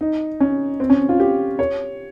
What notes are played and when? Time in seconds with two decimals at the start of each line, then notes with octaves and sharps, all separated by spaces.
0.01 D#4
0.40 C#4
0.80 C4
0.90 C#4
1.09 F4
1.20 G4
1.59 C#5